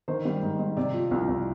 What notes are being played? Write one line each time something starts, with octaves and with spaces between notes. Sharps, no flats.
D#3 C5
G3
G#2
G#2
C3 D5
F3
C2
C2